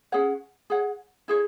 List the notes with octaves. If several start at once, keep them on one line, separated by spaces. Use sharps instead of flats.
C#4 G#4 C#5 F#5
G#4 C#5 F#5
E4 G#4 C#5